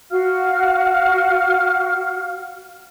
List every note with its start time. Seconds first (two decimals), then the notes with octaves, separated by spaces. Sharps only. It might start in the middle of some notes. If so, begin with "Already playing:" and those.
0.11 F#4 F5 F6